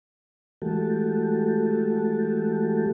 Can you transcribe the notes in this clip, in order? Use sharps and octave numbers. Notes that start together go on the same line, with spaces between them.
E3 G#3 A3 F#4 G4 A4